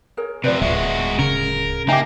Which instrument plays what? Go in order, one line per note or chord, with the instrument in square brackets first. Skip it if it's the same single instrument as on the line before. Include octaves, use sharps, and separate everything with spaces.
[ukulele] G#4 A#4 C#5
[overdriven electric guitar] C3 F3 [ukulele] B4 C5 D5
[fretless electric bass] D1 [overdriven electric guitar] G#3 F#4 [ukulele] F4 E5
[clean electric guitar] C#3 [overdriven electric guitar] A#4
[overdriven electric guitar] A#3 [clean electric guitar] D#4 G4 [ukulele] E5 G5 G#5